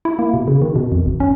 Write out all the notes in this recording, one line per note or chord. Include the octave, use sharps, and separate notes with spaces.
E4
A#3
B2
C#3
D#3
B2
F2
G#1
C#4